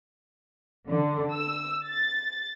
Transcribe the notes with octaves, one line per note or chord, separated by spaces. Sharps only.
D3
E6
A6